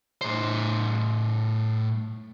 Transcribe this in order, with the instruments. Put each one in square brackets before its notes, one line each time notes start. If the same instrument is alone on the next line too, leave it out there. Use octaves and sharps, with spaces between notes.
[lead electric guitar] A2 C5